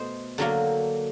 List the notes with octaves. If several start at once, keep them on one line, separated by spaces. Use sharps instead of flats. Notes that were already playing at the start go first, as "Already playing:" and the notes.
Already playing: B2 A3 C5 D#5
D3 F#3 A#3